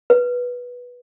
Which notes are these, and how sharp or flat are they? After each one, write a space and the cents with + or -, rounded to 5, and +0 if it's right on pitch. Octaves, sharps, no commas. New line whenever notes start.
B4 -15